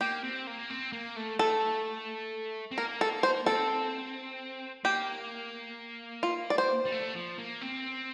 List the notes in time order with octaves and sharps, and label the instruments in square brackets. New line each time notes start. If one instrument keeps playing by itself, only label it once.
[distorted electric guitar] A#3 [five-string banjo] G4
[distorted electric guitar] C4
A#3
C4
A#3
A3
[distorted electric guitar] A3 [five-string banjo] A4
[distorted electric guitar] C4
[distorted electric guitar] A#3 [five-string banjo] A#4
[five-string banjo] A4
C5
[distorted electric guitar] C4 [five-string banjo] A4
[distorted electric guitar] A#3 [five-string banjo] G4
[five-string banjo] F4
D5
C5
[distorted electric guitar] G3
A3
F3
A#3
C4